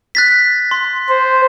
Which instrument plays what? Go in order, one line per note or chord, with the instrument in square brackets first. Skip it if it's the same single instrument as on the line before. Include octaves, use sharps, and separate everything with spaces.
[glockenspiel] F#6 A6 B6
C6
[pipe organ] C5